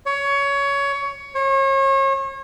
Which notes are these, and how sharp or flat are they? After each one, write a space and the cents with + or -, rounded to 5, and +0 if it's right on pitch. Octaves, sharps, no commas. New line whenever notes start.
C#5 +20
C#5 -35